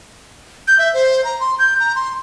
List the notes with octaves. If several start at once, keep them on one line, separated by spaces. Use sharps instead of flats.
G6
E5
C5
A#5
C6
G6
A#5
C6